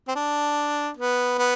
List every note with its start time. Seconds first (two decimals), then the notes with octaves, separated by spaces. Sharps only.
0.08 C4
0.16 D4
0.97 B3
1.38 B3